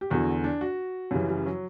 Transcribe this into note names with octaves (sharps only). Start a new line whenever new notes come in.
G4
E2 D3 F#4
D4
F#4
F#2 C#3 E3 G3
G3
F#3